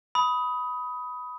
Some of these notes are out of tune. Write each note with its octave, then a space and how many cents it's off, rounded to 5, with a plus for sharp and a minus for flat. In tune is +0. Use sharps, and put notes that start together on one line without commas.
B5 +0 D#6 +20